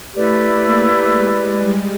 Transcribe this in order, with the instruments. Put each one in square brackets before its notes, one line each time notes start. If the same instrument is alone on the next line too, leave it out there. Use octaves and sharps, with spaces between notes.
[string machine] A3 [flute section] E4 G4 B4 D5
[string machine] A#3
G#3
G3